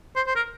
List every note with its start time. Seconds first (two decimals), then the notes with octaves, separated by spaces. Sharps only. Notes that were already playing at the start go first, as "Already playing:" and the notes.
0.16 C5
0.27 C5
0.36 A#4